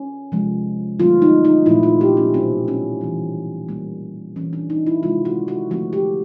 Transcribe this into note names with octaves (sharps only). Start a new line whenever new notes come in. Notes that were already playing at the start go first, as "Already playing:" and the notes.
Already playing: C#4
C3 F3 G#3
D#3 F#3 A3 C4 F4
D#4
D#4
A#2 F3 A3 C4 E4
F4
G4
C#4
B2 F#3 B3 C4
C#4
E3 G3 C4
E3 G3 A#3
E3 G3 C4 C#4
D4
D#4
E4
C3 D#3 G#3 C4 F4
F#4
F#4
D3 F3 A3 C4 F#4
G4